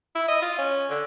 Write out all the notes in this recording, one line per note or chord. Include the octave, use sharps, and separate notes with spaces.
E4
D#5
F4
C#4
D3